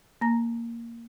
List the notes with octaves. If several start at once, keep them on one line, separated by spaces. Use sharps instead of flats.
A#3 A#5 A#6